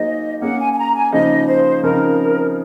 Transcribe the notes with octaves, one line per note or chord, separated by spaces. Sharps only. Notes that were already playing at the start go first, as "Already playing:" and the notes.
Already playing: F#3 A#3 D#4 G#4 C5 D#5
A#3 C#4 G#4 F#5
G#5
G#5
A#5
G#5
C#3 F3 A#3 D#4 G#4 D#5
C5
C#3 F3 C4 D#4 A#4